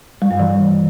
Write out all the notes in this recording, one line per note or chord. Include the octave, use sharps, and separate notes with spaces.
G3
G2
E3